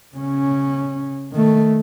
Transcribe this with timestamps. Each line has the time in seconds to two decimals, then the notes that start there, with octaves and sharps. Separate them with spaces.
0.15 C#3 C#4
1.32 D#3 A3